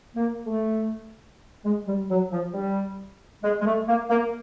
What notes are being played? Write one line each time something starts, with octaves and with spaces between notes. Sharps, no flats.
A#3
A3
G#3
G3
F#3
F3
G3
G#3
G#3
A3
A#3
A#3